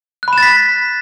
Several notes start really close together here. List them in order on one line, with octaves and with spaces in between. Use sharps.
F#6 B5 E7 A6 B6